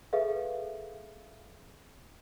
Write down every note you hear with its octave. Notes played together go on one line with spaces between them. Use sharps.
G#4 A4 B4 E5 F5